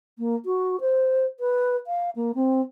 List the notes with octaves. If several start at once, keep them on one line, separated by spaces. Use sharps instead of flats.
A#3
F#4
C5
B4
F5
A#3
C4